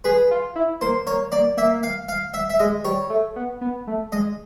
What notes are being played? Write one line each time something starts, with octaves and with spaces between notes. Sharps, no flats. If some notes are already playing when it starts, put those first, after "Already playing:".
G#4 B4
F4
E4
A#3 C5
A#3 C#5
A#3 D5
A#3 E5
F5
F5
E5
E5
G#3 D#5
G3 C#5
A3
B3
B3
A3
G#3 D#5